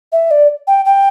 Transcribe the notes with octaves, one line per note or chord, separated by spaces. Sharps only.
E5
D5
G5
G5